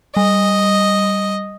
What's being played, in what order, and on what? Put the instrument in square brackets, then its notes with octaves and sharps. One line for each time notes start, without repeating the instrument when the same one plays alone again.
[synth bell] G3 [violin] D#5